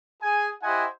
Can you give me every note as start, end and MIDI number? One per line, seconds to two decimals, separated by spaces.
0.22 0.49 68
0.22 0.49 80
0.63 0.84 64
0.63 0.84 67
0.63 0.84 72
0.63 0.84 75
0.63 0.84 78
0.63 0.84 80